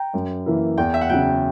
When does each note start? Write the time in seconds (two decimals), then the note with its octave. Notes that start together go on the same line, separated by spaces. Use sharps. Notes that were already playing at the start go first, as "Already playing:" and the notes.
Already playing: G5 A#5
0.14 F#2
0.46 E3 A#3 E4
0.77 E2 G5
0.94 E5
1.01 F#5
1.09 C#3 F#3 G5